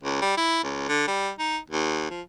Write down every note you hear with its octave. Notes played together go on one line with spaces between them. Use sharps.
C#2
G3
E4
C#2
D3
G3
D#4
D#2
F3